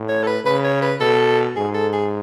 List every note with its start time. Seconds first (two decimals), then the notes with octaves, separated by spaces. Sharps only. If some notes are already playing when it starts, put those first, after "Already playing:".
Already playing: A2
0.09 C#5
0.23 A4
0.27 B4
0.45 C#3 B4
0.64 C#5
0.82 B4
1.00 B2 A4
1.56 G#2 G#4
1.74 A4
1.93 G#4